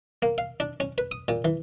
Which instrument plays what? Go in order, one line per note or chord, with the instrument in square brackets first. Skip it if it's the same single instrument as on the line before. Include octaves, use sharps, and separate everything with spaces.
[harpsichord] A#3
F5
D4
C#4
B4
D#6
A#2
E3